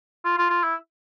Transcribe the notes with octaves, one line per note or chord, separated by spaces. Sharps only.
F4
F4
F4
E4